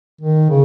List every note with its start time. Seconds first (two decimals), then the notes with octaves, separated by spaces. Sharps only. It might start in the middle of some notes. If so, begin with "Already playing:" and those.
0.21 D#3
0.50 C#3